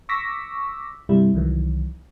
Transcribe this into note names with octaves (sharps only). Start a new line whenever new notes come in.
C#6 D6 E6 A#6 B6
G2 C3 G3 E4
C2 D#3 E3 F#3